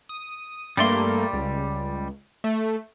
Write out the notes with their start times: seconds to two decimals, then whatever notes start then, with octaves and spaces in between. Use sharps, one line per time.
0.09 D#6
0.77 G2 G3 A3 A#3 D5 C6
1.33 C#2
2.44 A3